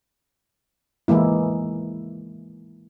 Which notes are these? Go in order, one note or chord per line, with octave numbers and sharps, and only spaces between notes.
E3 G#3 A#3 E4